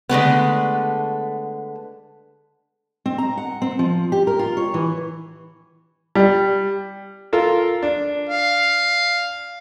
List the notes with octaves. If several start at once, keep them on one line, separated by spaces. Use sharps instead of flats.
D3 G#3 A3 B3
C4
A#5
F#5
C4
F3
G4
A#4
F4
C#5
E3
G3
F4 A4 A#4
D4
F5